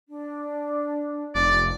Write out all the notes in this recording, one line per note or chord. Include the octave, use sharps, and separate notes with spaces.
D4
F1 D5